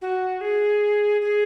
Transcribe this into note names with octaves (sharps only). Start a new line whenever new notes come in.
F#4
G#4
G#4